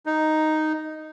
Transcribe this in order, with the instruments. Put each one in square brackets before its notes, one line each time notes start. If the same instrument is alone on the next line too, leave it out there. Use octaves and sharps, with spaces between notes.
[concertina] D#4